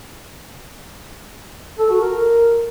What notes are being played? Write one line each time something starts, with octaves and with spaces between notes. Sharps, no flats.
A4
F#4
A#4